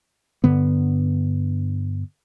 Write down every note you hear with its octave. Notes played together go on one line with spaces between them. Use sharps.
G2 D3 B3